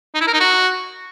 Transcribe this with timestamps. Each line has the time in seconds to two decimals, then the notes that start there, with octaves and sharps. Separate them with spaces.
0.14 D#4
0.21 E4
0.27 A#4
0.34 D#4
0.40 F#4